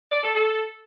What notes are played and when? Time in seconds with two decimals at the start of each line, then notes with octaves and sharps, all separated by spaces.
0.11 D5
0.23 A4
0.35 A4